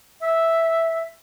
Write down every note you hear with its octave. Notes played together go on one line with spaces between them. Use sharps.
E5